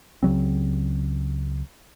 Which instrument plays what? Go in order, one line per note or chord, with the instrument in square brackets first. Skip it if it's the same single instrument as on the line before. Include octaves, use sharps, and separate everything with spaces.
[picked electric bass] C#2 C#3 F#3 C4